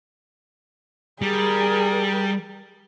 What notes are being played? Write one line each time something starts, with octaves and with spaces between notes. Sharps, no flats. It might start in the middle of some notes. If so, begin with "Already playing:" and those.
G3 G#4 A#4